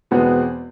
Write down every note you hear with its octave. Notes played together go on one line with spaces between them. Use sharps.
E2 B2 G#3 B3 C4